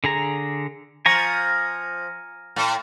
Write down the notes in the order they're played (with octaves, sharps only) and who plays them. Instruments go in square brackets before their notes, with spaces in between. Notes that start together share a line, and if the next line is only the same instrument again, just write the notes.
[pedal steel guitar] D3 G#4 A#5
[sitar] F3 [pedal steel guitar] G#5 A#5 C#6
[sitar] A2